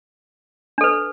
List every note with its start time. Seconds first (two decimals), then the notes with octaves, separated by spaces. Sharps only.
0.78 D4
0.81 A4
0.84 B4